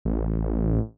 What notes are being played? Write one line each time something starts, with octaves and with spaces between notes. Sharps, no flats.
A1